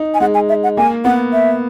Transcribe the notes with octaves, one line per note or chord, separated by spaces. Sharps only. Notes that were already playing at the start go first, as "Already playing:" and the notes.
Already playing: D#4
G#5
G#3 F#5
G#5
E5
F#5
A#3 G#5
B3 F#5
E5